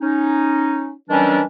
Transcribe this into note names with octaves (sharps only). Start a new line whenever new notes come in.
C#4 D#4
D#3 E3 F#3 G3 C#4 D4